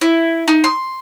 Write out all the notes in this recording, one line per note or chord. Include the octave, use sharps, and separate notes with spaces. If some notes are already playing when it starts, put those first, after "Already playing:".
E4
D#4
C6